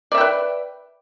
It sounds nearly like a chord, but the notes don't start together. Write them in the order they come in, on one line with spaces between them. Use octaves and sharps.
D5 E5 G5 B4